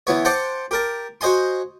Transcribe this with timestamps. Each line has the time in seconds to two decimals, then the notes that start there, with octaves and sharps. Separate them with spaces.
0.07 E3 B3 C#5
0.25 C5 F#5 G5 A5 C6 D6
0.71 G4 A#4 A5
1.21 F#4 C5 D#5 G#5 C6